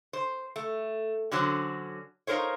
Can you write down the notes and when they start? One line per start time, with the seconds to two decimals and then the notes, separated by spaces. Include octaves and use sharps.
0.13 C5
0.56 A3
1.32 D3 F#3 C#4 F#4 C5
2.27 D#4 F4 A#4 C5 C#5